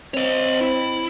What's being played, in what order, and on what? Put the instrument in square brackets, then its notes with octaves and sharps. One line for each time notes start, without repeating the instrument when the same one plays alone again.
[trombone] C4 [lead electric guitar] C#5 D#5
[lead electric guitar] E4